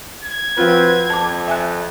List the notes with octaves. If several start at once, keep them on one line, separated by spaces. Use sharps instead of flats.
G#6
F3 C4 F4 F#4 B4
F2 A5 D6
E5 G#5 F#6